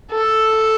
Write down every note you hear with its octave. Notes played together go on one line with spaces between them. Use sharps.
A4